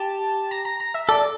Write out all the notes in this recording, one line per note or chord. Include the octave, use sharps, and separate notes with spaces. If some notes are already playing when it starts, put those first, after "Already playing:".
Already playing: G4 A5
A#5
A#5
A#5
E5
A4 D5